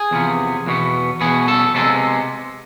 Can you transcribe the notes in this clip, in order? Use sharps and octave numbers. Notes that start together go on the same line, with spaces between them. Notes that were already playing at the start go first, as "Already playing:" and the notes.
Already playing: G#4
E2 C3 F3 B3
E2 B2 B3
E2 B2 B3 G#4
A4
C3 G#3 B3 A4